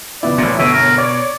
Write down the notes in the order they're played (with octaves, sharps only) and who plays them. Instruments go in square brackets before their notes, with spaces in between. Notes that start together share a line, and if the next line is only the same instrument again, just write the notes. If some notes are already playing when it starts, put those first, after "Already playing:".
[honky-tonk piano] C#2 B3 E4 [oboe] D5
[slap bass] A1 A#2
[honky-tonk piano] G1 C#5 D7 [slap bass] B2 [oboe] E5
[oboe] A#4
[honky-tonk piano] C#5 [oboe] D5